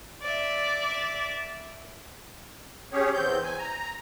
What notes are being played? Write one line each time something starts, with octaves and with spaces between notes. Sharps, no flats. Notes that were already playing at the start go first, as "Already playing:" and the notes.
D5 E5
C#4 G4 G#4 C#5
E2 C4 G6
G#5
A#5